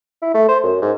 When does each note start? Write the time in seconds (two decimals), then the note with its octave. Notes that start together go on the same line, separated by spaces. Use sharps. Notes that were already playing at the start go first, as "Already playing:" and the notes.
0.22 E4
0.35 A3
0.48 C5
0.64 F#2
0.82 G#2